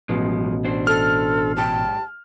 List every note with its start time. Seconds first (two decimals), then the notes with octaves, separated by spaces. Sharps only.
0.09 A1 F#2 B2 F3 G#3
0.65 D4 C5
0.87 A4 F6
1.57 G#2 G4 G5 A5